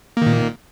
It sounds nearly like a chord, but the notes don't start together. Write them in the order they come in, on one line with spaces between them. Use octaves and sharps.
A#3 D#3 A#2